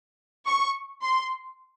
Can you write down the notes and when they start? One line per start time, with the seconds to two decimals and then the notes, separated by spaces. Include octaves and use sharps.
0.46 C#6
1.02 C6